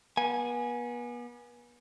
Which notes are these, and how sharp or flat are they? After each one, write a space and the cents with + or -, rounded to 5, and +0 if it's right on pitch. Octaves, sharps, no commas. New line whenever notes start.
B3 -35 G#5 +0